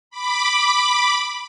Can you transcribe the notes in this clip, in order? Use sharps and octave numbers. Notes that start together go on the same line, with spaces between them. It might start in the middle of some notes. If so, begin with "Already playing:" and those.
B5 D6